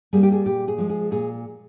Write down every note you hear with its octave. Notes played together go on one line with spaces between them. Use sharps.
G3 A#3 G#4
G4
G#4
A#2 G4
G#4
F3 G#3
G#4
A#2 G#4